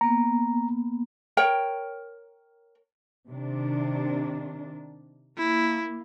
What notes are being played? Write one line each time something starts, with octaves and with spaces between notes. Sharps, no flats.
A#3 B3 A#5
A#4 C#5 G5
C3 D#3 D4
A#3 E4